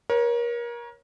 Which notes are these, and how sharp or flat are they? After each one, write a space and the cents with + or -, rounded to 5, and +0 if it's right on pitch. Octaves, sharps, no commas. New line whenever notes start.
A#4 +30 C#5 -10